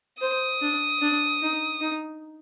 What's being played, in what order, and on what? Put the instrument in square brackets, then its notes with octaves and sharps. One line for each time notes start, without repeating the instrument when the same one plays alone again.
[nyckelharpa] C5 [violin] D#6
[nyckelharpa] D4
D4
D#4
D#4